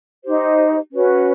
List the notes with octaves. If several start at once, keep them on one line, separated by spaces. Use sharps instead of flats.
D#4 G4 C5
C#4 F#4 B4